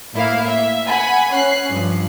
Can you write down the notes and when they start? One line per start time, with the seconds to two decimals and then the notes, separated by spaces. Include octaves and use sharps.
0.13 A2 A#3 E4 F5
0.47 E5
0.86 F#5 G#5 B5
1.31 C#4 F#6 C7
1.69 G2 F3